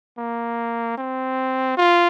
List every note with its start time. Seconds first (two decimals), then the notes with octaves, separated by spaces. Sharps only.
0.18 A#3
0.98 C4
1.78 F4